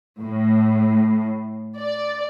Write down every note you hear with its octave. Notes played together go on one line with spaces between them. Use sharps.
A2
D5